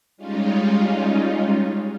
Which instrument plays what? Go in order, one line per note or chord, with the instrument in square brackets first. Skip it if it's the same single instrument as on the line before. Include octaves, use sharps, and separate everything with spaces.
[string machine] G3 G#3 C#4 D#4 F4